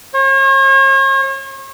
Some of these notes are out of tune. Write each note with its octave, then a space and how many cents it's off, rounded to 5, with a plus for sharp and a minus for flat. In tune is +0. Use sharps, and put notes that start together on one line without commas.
C#5 -45